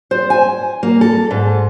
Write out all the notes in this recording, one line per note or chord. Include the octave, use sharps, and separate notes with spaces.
C5
G#5
A#3
A4
G#2